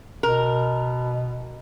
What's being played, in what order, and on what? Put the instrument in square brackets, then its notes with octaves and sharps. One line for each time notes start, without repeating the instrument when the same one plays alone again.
[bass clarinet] B2 [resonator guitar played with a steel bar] A#4